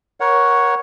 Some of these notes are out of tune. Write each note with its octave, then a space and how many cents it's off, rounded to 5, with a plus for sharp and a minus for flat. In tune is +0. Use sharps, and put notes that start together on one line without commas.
A#4 +25 C#5 +0 F#5 +0